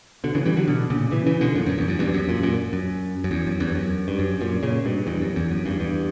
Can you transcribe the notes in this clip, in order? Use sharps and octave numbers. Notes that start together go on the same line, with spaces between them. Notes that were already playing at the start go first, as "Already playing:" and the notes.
B2 D3
C#3 E3
E3 G3
D3 F#3
B2 D3
A#2 C#3
C#3 E3
C#3 E3
B2 D3
F#2 A#2
F#2
E2
F#2
E2 G2
F#2
F#2 A#2
F#2 A#2
F#2
F#2
E2
F#2
E2 G2
F#2
G2
F#2
F#2 A#2
A#2 C#3
G2 B2
E2 G2
F#2
E2
F#2
E2 G2
E2 G2